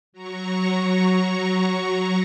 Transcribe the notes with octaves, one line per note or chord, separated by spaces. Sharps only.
F#3 A#5 C#6